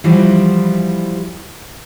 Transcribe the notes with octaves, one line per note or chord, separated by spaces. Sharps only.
E3 F3 G3 E4 F#4